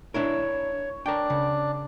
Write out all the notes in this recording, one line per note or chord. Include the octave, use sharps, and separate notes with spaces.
D4 E4 A#4 C#5
D4 A#4 G5
C#3